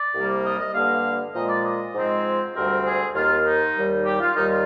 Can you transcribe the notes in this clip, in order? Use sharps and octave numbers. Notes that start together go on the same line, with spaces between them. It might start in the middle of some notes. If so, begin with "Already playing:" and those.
Already playing: D5
C2 C3 G3 A#3
D#5
D#5
G2 D3 G3 A#3 F5
A#2 F3 G#3 D#5
D5
D#5
G#2 F3 G#3 C4
D2 C3 G3 C4 A#4
G#4
D#2 D#3 A#3 F4
D#4
D#2 D#3 G3
G4
F4
D#2 D#3 G3 D#4
F4